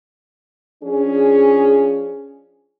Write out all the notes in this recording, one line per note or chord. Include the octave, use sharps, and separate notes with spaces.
F3 C#4 D4 G#4